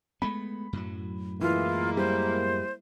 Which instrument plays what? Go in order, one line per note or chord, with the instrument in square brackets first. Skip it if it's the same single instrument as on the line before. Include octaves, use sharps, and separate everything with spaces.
[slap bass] G#3 A3 B3 [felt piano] B5
[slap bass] F#2 A2 F#3
[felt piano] E3 [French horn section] G#3 A#3 E4 [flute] F4
[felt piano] G3 [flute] C5